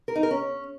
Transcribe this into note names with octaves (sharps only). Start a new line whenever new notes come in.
A#4
D#4
A#4
C#4